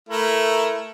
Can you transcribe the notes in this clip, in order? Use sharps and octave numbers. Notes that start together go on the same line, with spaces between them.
A3 E4 A#4